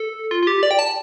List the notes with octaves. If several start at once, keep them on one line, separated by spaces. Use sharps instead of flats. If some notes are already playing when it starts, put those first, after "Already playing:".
Already playing: A4
F4
F4
G4
D5
G5
A5